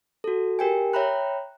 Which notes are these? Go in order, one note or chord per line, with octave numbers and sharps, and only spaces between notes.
F#4 A4
G4 A#4 G5 G#5
C#5 E5 G5 A#5 B5 F#6